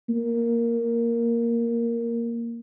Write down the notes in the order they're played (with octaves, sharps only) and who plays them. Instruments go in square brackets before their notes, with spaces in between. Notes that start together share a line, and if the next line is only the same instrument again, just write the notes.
[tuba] A#3